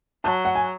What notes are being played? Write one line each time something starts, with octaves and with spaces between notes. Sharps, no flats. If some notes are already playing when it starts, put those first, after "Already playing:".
F#3 A5
F#5
G#5